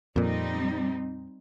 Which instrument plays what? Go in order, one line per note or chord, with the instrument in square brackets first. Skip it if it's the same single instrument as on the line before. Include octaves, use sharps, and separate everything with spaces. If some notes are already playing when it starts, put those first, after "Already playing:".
[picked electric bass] F2 A#2 [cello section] G3 C4 D#4